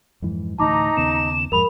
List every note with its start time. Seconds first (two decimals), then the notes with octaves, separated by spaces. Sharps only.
0.22 F2 G#2 E3
0.59 D2 A2 E3 D#4 A5 A#5 D6
0.97 D#2 C#3 B3 E7
1.52 F2 G#2 G#3 A#4 B5 F7